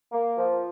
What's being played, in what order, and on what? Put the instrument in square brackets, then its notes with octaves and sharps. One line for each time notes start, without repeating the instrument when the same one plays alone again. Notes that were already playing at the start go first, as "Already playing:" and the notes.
[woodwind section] A#3
F3